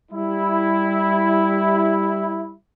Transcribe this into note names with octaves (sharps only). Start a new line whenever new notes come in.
G3 E4